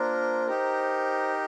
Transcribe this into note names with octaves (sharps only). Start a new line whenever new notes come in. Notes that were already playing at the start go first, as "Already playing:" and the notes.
Already playing: A#3 D4 F4 A#4 C5
D#4 G4 A#4